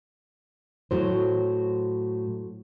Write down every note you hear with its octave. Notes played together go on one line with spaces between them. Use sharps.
A2 F#3 C5